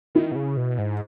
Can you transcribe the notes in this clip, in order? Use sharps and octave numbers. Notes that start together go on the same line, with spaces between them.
D#3 E4
B2
C#3
B2
G#2